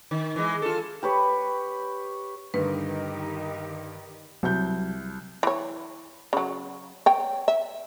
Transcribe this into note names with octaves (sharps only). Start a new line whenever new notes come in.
D#3
E3 G#3
F4 A4
G4 B4 C#5
G2 D3 D#3 D#4 G4 B4
C2 F#3 G6
E3 C#5
C#3 F#3
C#5 G5
E5